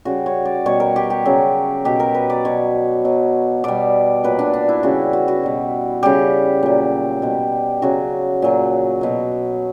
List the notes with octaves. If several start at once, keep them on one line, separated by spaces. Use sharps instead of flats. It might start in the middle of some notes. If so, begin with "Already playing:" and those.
C#3 G3 F#4
C#5
D5
B2 G3 C#5
A#4
G4
G4
C#3 F#3
B2 F#3 G4
A#4
B4
D5
B2 F#3 C#5
B2 F#3
B2 G3 D5
A#2 F#3 B4
D4
D4
E4
C#3 E3 G3 F#4
F#4
F#4
B2 G3
C#3 G3 G4
A#2 F#3
B2 G3
C#3 F#3 F#4
A#2 F#3
B2 F#3